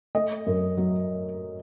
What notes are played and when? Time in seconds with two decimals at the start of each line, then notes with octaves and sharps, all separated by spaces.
0.15 A3 D#5
0.47 F#2
0.77 F#3